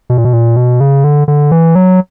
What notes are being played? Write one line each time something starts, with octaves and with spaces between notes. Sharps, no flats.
B2
A#2
B2
A#2
B2
C#3
D3
D3
E3
F#3